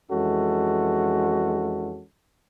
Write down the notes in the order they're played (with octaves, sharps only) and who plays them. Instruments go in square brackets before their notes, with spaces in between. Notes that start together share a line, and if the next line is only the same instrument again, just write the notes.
[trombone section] F2 E3 G#3 C#4 F#4 A4